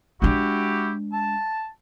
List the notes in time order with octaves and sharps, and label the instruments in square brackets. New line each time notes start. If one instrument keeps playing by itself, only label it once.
[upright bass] G#3 D4 [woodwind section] E4 F#4 G4
[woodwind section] A5